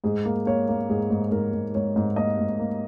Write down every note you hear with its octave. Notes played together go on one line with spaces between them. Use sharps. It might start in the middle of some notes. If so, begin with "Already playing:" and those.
G#2 G#4
A#3
A#3 C#5
A#3
G#2 G#4
G#2
G#2 A#4
G#2
G#2 C#5
G#2
A#3 D#5
G#2
A#3